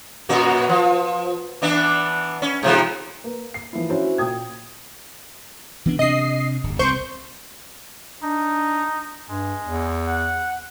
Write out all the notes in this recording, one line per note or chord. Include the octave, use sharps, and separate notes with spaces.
F#2 A#2 F#4
F3
E3 B3 D4
C#4
G#2 C3 F3
A#3 B4
C7
E3 F3 A#3 E4
C#4 D4 E4 F#4 C5 C#5
A#2 G5 D#6 G#6
E3 B3 D4
C3 C4 D4 D#5 C7
D1 G1
C2 A#3 C4 C5 C#6 G6
D4 D#4
G2 G#3
E2
F#5